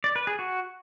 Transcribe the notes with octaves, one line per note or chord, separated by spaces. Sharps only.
D5
B4
G#4
F#4